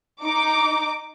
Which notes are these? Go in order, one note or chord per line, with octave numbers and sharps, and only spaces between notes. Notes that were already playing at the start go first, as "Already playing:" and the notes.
D#4 D6